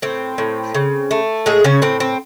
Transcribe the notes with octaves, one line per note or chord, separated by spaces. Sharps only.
A2 C4
A2
C#3
A3
A2 G#3 G#4
C#3 C#4
A2 C4
C4